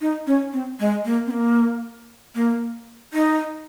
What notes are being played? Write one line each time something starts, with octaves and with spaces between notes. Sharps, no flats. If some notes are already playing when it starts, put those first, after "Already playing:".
D#4
C#4
C4
G#3
A#3
C4
A#3
A#3
D#4